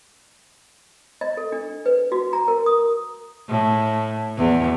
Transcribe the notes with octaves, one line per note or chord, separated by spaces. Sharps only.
D#5
A4
D4
B4
F#4
A#5
A#4
D#6
A2
E2